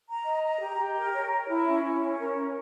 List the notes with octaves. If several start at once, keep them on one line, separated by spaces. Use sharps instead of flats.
A#5
D#5
A#5
G4
G4
A#4
C#5
A#4
E4
C#4
E4
C#4
A#4
A#4